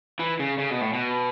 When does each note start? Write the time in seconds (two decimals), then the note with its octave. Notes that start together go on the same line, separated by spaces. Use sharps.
0.19 E3
0.39 C#3
0.58 C#3
0.70 B2
0.82 A2
0.93 B2